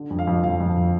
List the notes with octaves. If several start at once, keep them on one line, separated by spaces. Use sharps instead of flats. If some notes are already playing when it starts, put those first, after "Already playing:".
Already playing: D3
F2
F5
F2
F2 F5
F2